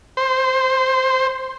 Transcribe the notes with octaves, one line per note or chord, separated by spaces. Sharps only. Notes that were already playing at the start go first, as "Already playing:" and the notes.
C5